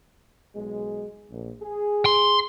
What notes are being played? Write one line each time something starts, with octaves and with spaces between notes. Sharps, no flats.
B1 G#3
A#1
G#4
C6